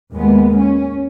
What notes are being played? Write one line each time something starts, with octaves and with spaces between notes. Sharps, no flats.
D#2 G#3 B3
C#4